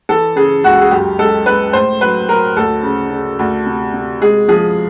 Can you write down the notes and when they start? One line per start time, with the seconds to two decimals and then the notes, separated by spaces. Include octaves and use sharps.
0.09 E3 A4
0.36 C#3 G#4
0.64 C#2 F#4
0.81 G#4
0.91 F#2 G4
1.18 G#3 A4
1.46 G#3 B4
1.73 A2 C5
2.01 F#3 B4
2.29 F#3 A#4
2.56 D2 A4
2.83 C#3
3.11 C#3
3.39 D2
3.66 C3
3.94 C3
4.21 G#3 G#4
4.48 F3 G#4